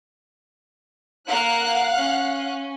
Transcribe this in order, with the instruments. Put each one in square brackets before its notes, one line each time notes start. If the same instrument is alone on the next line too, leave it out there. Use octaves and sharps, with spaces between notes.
[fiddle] A#3 A#4 [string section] F5 F#5 F#6
[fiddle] C#4